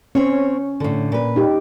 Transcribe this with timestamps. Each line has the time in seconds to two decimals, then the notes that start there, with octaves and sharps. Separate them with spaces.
0.15 C4 C#4 C#5
0.80 A2 D3
1.12 A#2 B4
1.36 D#4 G4